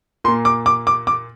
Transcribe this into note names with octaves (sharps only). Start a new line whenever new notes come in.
A#2 A#3 C6
D6
D6
D6
D6